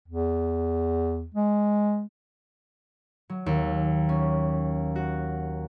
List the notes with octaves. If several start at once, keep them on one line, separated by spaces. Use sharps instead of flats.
E2
G#3
F#3
D#2
C#4
F#4